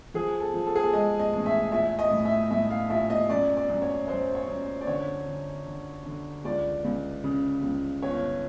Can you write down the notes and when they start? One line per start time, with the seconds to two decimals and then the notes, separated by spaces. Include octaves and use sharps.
0.14 F3 G#4
0.40 A4
0.54 F3
0.67 A4
0.75 G#4
0.83 A4
0.93 G#3 D#5
1.20 D#5
1.33 A1
1.46 E5
1.72 A#1 E5
1.99 D#5
2.11 A2
2.25 E5
2.51 A2 E5
2.70 F5
2.90 A#1 E5
3.10 D#5
3.29 F#2 D5
3.57 D5
3.69 F#2
3.82 C#5
4.08 F#2 C5
4.35 C#5
4.48 F#2
4.81 D5
4.87 D3 C#5
5.27 D3
5.66 D3
6.06 D3
6.45 C#2 D5
6.84 C#2
7.24 C#3
7.63 C#2
8.03 G1 C#5